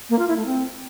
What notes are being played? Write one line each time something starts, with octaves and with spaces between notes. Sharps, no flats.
A#3
F4
E4
A3
C4